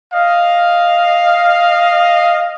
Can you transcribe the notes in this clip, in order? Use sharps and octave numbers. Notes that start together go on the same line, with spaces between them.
D#5 F5